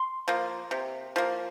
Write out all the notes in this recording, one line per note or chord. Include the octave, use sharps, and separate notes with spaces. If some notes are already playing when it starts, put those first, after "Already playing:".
Already playing: C6
F3 A#3
C3
F3 A#3